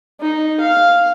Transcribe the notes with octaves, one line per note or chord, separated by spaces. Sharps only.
D#4
F5